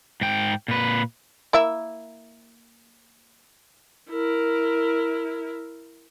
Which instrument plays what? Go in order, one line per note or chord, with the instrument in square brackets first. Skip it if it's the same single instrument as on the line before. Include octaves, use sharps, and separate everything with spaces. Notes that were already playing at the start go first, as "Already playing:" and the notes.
[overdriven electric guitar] G#2 G5
A#2 B4
[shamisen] A#3 E4 E5
[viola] E4 A#4